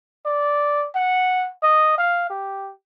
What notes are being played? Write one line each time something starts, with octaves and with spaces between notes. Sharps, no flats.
D5
F#5
D#5
F5
G4